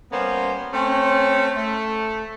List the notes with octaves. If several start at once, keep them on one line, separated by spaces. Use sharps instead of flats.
G3 A#3 B3 C#4 C5
A3 C4 C#4
A3